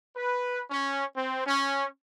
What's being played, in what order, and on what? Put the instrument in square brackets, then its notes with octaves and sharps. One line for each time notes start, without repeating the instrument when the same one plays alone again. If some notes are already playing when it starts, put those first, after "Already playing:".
[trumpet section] B4
C#4
C4
C#4